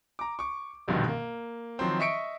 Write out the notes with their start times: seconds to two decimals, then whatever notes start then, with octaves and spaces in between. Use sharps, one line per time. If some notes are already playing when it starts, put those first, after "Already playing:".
0.19 A#5 D6
0.39 C#6 D6
0.88 E1 A#1 G2 B2 D3 D#3
1.08 A#3
1.79 D#3 F3 F#3 C4
1.99 D#5 E5 C#6 B6 C#7 D7